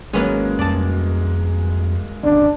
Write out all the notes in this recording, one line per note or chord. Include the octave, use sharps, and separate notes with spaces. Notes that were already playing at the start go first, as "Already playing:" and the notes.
G#1 F#3 G#3 A#3 B3 C#4
F2 G3 D5 A5
G1 D#2 C#4 D4